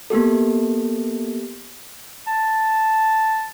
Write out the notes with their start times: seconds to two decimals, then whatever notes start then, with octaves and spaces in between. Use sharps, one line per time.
0.10 A#3 B3 G4 A4
2.27 A5